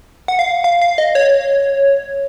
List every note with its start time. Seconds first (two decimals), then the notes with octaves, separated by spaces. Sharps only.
0.28 F#5
0.39 F5
0.64 F5
0.82 F5
0.98 D#5
1.15 C#5